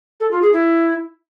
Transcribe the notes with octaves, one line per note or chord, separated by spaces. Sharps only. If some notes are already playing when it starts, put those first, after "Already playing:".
A4
F4
G#4
E4